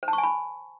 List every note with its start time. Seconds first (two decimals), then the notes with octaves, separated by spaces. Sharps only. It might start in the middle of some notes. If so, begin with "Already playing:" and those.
0.03 C5
0.08 A5
0.13 C#6
0.18 G#5
0.23 B5